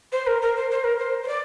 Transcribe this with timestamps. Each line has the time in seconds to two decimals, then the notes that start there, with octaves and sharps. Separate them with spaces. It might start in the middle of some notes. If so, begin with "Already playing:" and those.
0.12 C5
0.27 A#4
0.42 A#4
0.57 C5
0.71 C5
0.84 A#4
0.99 C5
1.23 C5
1.28 D5